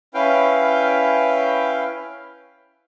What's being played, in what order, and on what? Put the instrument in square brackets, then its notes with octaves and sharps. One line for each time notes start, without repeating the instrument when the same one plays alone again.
[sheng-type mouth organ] C#4 E4 B4 F5 G5